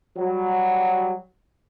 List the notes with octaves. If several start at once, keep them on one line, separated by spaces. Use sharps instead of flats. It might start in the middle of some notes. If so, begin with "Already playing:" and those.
F#3 G3